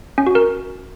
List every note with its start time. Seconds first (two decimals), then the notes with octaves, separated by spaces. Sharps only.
0.18 C#4
0.27 F#4
0.35 A#4